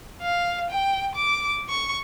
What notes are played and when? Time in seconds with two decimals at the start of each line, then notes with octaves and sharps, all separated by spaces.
0.22 F5
0.71 G5
1.15 D6
1.69 C#6